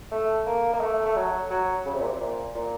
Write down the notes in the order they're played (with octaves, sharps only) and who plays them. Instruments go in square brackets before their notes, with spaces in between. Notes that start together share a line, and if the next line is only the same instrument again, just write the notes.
[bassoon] A3
A#3
A#3
A3
A3
F#3
F#3
C#3
C3
A#2
C3
A#2
A#2